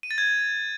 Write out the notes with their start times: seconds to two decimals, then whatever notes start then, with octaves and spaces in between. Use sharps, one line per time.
0.03 D#7
0.11 A6
0.18 G#6